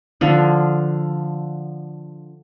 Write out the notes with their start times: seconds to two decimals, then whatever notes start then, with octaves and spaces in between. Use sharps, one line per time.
0.21 D3 F3